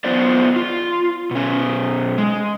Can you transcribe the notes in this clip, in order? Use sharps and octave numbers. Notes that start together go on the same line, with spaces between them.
B3 F4 C5 D5
F4
B2 C#4
G#3